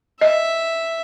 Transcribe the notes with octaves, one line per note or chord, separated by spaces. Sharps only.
D#5 E5